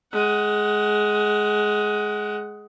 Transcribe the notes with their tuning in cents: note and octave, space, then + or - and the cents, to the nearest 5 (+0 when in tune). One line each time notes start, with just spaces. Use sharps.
G#3 +10 F#5 +20